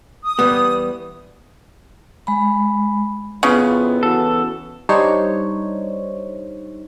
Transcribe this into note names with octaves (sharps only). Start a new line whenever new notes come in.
D#6
E2 G3 B3
G#3 B5
F2 C#3 B3 E4 F4
E3 F#4 A4
G3 D4 D#4 C5 C#5